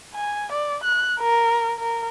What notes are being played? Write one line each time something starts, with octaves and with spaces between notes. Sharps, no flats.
G#5
D5
F#6
A#4
A#4